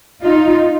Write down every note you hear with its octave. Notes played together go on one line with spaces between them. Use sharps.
D#4 F4